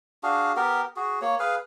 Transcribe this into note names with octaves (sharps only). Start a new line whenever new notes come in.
D4 F#4 G#4 F5
B3 G4 A#4
F#4 G#4
A#3 C#5
G#4 B4 F5